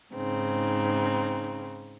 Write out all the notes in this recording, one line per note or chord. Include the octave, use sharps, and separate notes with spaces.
G#2 C#3 C4 D#4